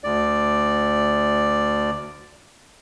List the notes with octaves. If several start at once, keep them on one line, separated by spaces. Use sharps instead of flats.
D2 D5